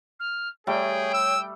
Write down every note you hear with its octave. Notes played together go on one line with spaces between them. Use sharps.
F6
G3 A3 G#4 C#5 G5
E6